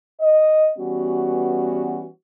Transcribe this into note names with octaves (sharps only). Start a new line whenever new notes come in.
D#5
E3 G3 B3 C#4 F#4